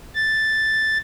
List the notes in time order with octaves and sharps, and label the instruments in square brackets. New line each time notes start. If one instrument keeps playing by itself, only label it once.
[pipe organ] A6